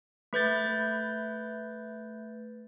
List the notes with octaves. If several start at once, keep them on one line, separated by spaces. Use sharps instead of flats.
A3 B4 G6 A6